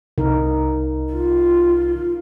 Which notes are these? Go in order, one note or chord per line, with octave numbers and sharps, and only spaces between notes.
C2 D#4 A#4
F4